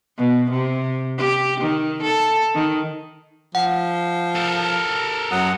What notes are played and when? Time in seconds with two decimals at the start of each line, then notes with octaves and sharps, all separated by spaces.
0.18 B2
0.50 C3
1.18 G4
1.60 D#3
2.02 A4
2.55 D#3
3.55 F3 F#5
4.35 A4 A#4
5.31 F#2 F#3 F#5 D#6